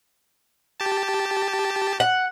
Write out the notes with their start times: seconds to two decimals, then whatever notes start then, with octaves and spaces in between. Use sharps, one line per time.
0.80 G4 A5
2.00 F#5